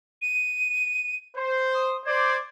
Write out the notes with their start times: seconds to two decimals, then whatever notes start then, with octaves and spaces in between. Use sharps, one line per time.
0.22 D#7
1.35 C5
1.75 D#6
2.05 C5 D5 G#6